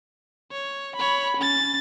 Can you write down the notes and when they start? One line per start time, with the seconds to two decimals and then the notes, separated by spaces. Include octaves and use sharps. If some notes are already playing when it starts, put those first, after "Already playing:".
0.52 C#5
0.96 C#5 B5
1.38 C#4 A6